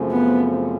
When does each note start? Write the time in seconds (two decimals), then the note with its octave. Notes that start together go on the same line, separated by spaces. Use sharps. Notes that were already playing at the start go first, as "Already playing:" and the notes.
Already playing: F#2 C#3 F3 A3 C4
0.11 B3